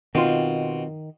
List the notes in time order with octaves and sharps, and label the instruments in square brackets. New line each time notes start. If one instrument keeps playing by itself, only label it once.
[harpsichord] B2 [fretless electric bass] D#3 [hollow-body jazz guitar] C4 F4